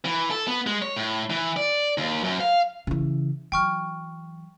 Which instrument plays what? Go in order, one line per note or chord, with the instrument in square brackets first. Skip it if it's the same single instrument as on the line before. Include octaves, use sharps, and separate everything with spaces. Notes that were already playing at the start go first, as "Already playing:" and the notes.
[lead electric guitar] E3
A4
B3
G#3
C#5
A2
E3
D5
D#2
F#2
F5
[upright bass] C#3 E3
[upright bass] E3 F#3 [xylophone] G5 C#6 F6